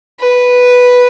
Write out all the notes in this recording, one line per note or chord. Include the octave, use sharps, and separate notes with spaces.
B4